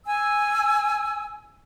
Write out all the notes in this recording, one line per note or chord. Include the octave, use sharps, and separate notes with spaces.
G#5 E6